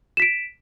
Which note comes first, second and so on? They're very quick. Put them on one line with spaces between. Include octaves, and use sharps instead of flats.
E7 B6 D7